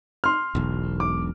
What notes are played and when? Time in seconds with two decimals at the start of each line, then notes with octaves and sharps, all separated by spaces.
0.24 C6 F6
0.55 E1 B1
1.00 D6